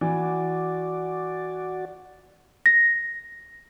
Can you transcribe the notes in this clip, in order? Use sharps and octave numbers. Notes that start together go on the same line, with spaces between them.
E3 F#4 D5
A#6